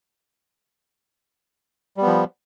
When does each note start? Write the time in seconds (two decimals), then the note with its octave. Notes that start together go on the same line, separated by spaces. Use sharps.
1.97 G3
2.02 B3
2.06 F3